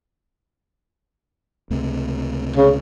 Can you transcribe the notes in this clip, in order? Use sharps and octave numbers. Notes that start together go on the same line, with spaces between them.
C#2 C3 A3
C#3